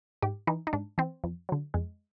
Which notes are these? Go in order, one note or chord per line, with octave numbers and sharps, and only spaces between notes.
G#2 G4
E3 D#4
D#4
G#2 D4
E3 C4
F2
D3 F#3
F2 G#3